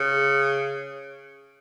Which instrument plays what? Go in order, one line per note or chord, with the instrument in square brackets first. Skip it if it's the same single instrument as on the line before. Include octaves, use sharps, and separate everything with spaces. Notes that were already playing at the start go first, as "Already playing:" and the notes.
Already playing: [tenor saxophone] C#3